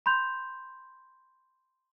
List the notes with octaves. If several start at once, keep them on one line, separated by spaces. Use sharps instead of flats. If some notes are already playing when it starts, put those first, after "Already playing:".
B5 C6 G6 F7